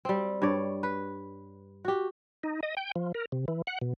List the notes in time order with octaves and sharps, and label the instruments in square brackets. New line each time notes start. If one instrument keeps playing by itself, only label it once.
[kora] G3 C4
G2 C#5 D5
B4
F#4 G4
[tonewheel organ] D#4
D#5
G5
F3
A#4
C3
E3
F#5
B2